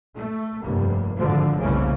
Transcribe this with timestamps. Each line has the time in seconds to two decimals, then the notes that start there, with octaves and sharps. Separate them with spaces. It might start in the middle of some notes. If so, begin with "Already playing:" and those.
0.14 A3
0.62 F1 G2 A#3
1.18 G#1 D3 F3
1.59 F1 C2 C#3 E3 A#3 C#4